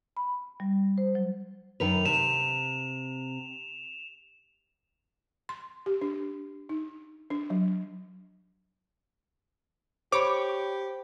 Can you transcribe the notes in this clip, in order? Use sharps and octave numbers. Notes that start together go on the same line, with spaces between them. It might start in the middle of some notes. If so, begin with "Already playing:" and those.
B5
G3
C5
F#3
F#2 D#3 B4 F7
C3 E7
C6
G4
D4
D#4
D4
F#3
G4 C5 C#5 B5 D6